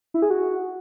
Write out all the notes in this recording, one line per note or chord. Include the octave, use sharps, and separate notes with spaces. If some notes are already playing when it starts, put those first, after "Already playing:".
E4
G#4
F#4